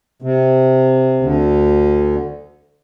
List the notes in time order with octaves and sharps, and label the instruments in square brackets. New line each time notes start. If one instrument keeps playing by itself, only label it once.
[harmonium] C3
D2 D3